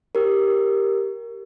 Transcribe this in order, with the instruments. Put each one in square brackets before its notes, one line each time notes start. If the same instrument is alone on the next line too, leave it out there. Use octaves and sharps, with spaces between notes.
[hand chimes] G4 A#4